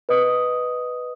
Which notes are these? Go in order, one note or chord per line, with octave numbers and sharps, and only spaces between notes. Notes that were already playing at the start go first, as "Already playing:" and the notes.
B4 D#5 D#6